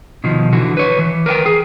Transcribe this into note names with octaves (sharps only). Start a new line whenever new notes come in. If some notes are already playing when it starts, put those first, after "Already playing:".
B2 D#3 F3
D3 E3 F#4
B4 C#5
E3
A#4 B4 F#5 G5
G#4